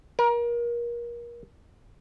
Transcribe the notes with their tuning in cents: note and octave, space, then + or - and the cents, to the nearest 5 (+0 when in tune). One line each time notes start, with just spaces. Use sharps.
A#4 +30